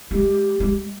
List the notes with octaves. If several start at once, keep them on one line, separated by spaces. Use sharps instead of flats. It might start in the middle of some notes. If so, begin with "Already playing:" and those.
G#3 G4
G#3